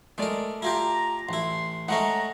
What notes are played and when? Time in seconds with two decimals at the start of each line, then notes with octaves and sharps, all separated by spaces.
0.18 G#3 A3 A#4 D5
0.62 E4 F4 G4 A#5
1.29 A1 E4 C6
1.88 G#3 A3 C#4 F#5 A#5